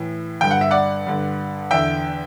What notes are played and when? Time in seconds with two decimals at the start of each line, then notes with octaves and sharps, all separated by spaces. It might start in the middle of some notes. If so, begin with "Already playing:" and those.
Already playing: A2 E3
0.41 G2 D3 G5
0.51 F#5
0.61 E5
0.71 D5 F#5
1.06 G2 D3
1.71 E2 D3 E5 G5